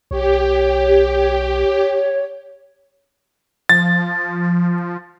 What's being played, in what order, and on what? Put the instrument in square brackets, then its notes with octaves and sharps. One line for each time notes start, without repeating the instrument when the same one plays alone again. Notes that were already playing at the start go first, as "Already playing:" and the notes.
[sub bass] B1 [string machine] G4 [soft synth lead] C#5
[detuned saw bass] F3 [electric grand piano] A6